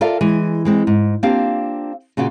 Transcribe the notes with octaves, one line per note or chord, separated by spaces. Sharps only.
F4 A4 A#4 D5 E5 F5
E3 G#3
E3 G#3 C4
G#2
A#3 C4 D4 F4 G4 F5
A#2 C#3 F4 F#4